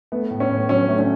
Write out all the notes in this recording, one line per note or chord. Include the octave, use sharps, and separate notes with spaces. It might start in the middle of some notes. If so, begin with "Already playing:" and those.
A3 B3
A2
C#4
A2
F#3 C#4
A3
C#4